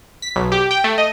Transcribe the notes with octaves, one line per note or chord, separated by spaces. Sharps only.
B6
B1
G4
G5
A3
D#5